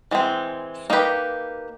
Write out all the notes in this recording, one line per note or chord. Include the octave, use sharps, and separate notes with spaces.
E3 G#3 C4
A#3 D#4 G4 B4